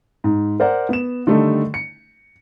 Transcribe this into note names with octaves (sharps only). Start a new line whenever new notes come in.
G#2
A#4 C5 D5 F#5
B3 E7
D3 D#3 G3 A3 D#4
C#7